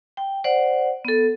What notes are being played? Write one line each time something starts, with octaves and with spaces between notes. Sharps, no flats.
G5
C5 D5 F#5
B3 A4